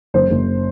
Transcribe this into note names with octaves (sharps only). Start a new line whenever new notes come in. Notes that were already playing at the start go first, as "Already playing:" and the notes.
F#1 C5
F#1